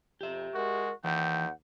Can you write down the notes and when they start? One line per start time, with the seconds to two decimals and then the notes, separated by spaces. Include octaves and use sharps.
0.21 F2 G4 E5
0.54 G#3 F#4 A#4
1.04 D#2 E3 F#5 G5